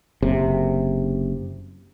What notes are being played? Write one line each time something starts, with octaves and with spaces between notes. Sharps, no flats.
F#1 C3